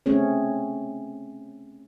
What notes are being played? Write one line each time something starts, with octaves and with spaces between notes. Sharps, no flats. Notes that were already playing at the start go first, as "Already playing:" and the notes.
A3 C4 C#4 G#4 C#5